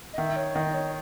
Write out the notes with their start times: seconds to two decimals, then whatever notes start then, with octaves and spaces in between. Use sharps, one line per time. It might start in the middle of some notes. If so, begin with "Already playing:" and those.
0.13 D#5
0.18 D#3 E5
0.36 C#5
0.55 D#3 D#5
0.74 C#5